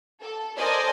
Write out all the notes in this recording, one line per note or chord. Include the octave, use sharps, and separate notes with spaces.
A4
A4 A#4 C5 D5 D#5 G#5